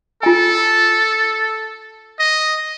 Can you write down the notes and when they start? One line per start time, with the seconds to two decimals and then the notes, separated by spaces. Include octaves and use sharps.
0.23 F4 A4 G#5
2.20 D#5